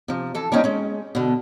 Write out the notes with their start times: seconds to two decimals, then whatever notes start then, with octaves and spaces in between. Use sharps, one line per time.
0.08 C3 F3
0.35 E3 A4
0.52 G3 A#3 C4 C#4 D#4
0.64 G#3 C#4
1.15 B2 D3